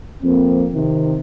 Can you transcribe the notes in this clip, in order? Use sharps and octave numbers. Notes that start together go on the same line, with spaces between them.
F2 A#3 C4
C3 D#3